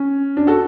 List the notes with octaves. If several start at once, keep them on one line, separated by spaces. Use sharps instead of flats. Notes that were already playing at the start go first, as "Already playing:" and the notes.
Already playing: C#4
D4
F#4 A4